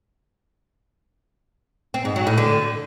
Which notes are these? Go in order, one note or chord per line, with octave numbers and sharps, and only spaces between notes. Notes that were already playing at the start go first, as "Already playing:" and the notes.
C4
G#2
F#3
A2
D3